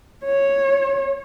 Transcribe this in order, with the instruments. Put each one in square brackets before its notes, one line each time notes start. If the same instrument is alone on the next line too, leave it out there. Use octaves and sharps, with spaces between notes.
[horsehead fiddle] C#5